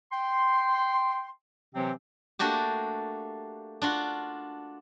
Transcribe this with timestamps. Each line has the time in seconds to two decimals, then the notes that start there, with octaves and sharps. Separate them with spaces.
0.12 G5 C6
1.75 C3 E3 F#3 C4
2.39 A3 A#3 D4 F#4 G4
3.82 D4 F4 F#4